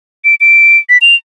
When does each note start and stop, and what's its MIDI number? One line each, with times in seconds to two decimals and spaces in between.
0.25 0.35 98
0.41 0.78 98
0.89 0.98 95
1.01 1.15 101